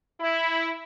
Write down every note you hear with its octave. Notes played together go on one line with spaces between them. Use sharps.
E4